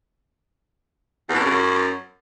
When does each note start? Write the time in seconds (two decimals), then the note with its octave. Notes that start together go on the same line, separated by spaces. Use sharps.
1.29 E2
1.34 B2
1.40 F#2
1.45 C#3
1.50 F#2